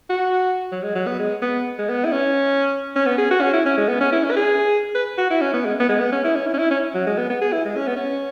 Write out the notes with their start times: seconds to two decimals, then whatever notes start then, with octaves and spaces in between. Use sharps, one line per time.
0.10 F#4
0.72 F#3
0.83 G#3
0.95 F#3
1.07 B3
1.20 G#3
1.42 B3
1.79 G#3
1.89 B3
2.05 E4
2.12 C#4
2.96 C#4
3.06 B3
3.18 G#4
3.31 F#4
3.41 C#4
3.53 E4
3.66 C#4
3.78 G#3
3.89 B3
4.01 C#4
4.12 E4
4.24 C#4
4.31 B4
4.37 G#4
4.95 B4
5.18 F#4
5.31 E4
5.41 C#4
5.54 B3
5.65 G#3
5.80 B3
5.89 G#3
6.00 B3
6.12 C#4
6.25 E4
6.36 C#4
6.47 E4
6.54 C#4
6.59 E4
6.71 C#4
6.95 F#3
7.07 G#3
7.18 B3
7.30 B3
7.42 G#4
7.53 E4
7.65 G#3
7.77 C#4
7.87 B3
7.96 C#4